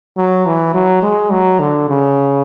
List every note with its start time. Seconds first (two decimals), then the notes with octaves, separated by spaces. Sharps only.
0.17 F#3
0.46 E3
0.74 F#3
1.03 G#3
1.31 F#3
1.59 D3
1.89 C#3